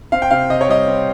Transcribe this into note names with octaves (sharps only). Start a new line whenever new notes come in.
C4 F5
G5
C3 F5
C3 D#5
C#5
G3 D#5
C4